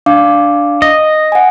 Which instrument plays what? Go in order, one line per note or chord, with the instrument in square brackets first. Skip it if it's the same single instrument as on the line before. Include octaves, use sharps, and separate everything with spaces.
[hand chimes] D4 F5 D6
[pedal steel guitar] D#5
[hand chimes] F#5 G#5